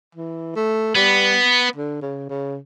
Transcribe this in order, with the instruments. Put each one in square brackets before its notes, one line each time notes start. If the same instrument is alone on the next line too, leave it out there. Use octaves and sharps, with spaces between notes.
[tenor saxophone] E3
A3
[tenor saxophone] G3 [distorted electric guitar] B3
[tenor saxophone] D3
C#3
C#3